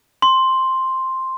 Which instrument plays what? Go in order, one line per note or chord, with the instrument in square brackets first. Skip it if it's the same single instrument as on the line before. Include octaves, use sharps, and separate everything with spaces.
[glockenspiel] C6